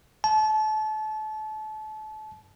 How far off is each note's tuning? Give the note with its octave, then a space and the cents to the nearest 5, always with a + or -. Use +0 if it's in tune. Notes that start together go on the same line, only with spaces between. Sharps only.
A5 -30